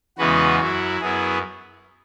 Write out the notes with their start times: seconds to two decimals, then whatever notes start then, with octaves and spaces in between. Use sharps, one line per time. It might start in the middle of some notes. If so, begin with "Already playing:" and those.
0.18 E2 C#3 E3 G#3 B3 F#4 B4
0.59 F#2 F#3 E4 F#4
1.01 F#2 F#3 B3 E4 G#4